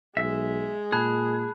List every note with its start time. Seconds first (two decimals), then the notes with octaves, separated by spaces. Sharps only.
0.17 B1 G#3 E5
0.92 A#2 G#4 A5 B5 F#6